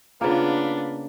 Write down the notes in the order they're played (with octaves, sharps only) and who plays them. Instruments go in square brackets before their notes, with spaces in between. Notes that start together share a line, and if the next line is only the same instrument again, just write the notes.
[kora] C#3 A#3 [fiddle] B3 D4 [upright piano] F4